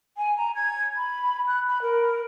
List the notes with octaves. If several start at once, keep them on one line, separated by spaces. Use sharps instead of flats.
G#5
A#5
G#6
B5
F#6
B5
A#4